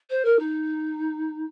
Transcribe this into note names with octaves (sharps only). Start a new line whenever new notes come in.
C5
A#4
D#4